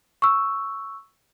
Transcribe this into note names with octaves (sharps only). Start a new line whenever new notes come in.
C#6 E6